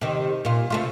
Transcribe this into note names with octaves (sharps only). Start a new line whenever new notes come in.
C3 D#3
A#2 F4
C3 A3 F4